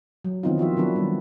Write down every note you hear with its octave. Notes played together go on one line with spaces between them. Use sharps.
F#3
D#3 E3 B3 C4 D#4 F4
F3 F4 F#4 E5
D3 F#3 B3 D4 E4 B4
D#3 G3